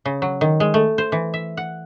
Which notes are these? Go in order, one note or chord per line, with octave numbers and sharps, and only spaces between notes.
C#3
F#3
D#3
G#3
A3
C5
E3
E5
F#5